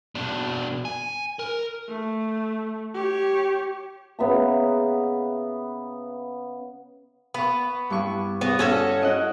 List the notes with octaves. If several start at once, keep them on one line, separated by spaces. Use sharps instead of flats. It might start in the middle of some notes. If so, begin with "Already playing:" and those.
B2 D4
G#5
A#4
A3
G4 C#5
C#3 B3 E5 A#5
B3 B4 C#6
G2 E4 C#6
B3 F#4
C#4 F#4 A4
E4 D#5 F#5